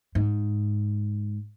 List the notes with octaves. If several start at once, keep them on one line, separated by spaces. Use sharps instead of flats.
G#2